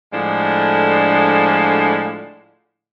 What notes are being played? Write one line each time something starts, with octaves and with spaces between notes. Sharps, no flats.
A2 D3 F3 G#3 D4